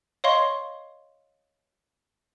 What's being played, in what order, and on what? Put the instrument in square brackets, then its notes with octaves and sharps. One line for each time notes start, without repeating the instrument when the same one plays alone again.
[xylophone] C#5 D#5 F5 C6 C#6